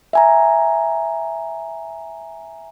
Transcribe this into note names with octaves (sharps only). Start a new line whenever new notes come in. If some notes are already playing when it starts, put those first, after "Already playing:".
E5 G#5 A#5